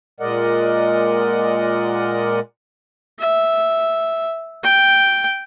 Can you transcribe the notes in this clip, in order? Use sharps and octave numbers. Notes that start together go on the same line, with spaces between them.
A#2 G#3 A#4 D5 D#5 F#5
E5
G5